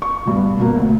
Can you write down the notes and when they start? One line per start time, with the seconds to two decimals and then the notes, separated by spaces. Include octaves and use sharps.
0.02 C#6
0.25 G2 B2
0.59 B2 A#3
0.76 D2